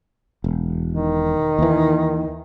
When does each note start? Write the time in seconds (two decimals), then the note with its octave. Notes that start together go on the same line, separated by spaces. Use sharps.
0.44 E1
0.92 D#3
1.59 D#2 E3